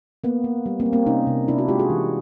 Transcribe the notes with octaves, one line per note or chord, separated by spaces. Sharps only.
A#3 B3
A#3
G3
A#3 C4
G3
A#3 C4
C3 C#4 D#4
C3
C3 D4 E4
E4 F#4
G#3 F4 G4
F#4 G#4
E3